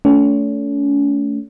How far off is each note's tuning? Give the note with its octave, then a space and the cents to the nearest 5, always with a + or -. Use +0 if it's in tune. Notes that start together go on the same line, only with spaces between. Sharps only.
A3 +0 C#4 +40